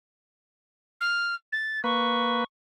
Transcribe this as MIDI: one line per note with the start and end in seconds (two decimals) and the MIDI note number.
1.01 1.35 89
1.52 1.82 93
1.84 2.44 58
1.84 2.44 71
1.84 2.43 85